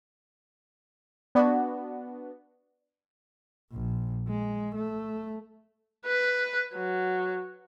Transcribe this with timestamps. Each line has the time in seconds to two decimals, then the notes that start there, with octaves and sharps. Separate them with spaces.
1.35 B3 D4 F#4 D5
3.72 A#1
4.28 G#3
4.75 A3
6.06 B4
6.74 F#3